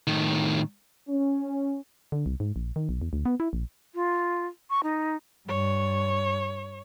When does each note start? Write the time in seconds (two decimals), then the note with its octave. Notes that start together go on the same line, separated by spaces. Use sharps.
0.07 A2 D#3
1.09 C#4
2.12 D3
2.26 C2
2.40 G#2
2.56 A#1
2.76 D#3
2.89 B1
3.02 E2
3.13 D2
3.25 B3
3.40 E4
3.53 A#1
3.95 F4
4.70 C#6
4.83 D#4
5.48 G2 C#5